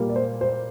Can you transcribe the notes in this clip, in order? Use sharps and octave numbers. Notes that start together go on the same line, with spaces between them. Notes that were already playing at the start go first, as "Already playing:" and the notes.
Already playing: A#2 G3 A#3
D5
C5
C5